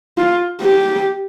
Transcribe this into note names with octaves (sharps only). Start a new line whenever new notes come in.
F4
G4